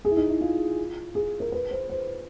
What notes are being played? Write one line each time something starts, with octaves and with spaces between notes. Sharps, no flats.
G#4
E4
D#4
E4
F4
G#4
A#4
B4
C5
C5